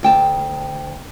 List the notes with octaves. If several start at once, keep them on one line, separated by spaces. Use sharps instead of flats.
D2 G5 A5